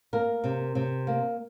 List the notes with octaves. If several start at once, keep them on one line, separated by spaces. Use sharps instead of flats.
A#3 A#4
C3
C3
A#3